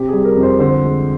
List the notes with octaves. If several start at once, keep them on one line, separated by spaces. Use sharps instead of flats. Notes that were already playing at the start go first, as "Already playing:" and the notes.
Already playing: C3 G4
G3 G#4
A#4
F2
C5
D3 C5
G#3